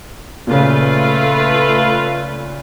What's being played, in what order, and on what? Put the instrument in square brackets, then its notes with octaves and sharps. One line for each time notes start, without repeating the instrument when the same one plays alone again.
[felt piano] A#2 C#3 [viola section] A3 F4 B4